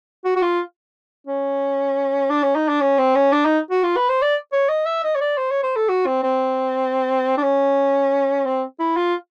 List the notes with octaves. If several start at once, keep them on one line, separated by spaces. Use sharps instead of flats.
F#4
F#4
F4
C#4
D4
C#4
D#4
D4
C#4
C4
C#4
D4
D#4
F#4
F4
B4
C5
D5
C#5
D#5
E5
D#5
C#5
D5
C5
C#5
C5
A4
F#4
C4
C4
D4
C#4
C4
E4
F4